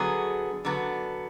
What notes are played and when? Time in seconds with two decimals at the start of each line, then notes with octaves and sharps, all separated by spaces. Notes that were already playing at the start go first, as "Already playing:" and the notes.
Already playing: D3 F#3 B3 G#4
0.65 D3 F#3 B3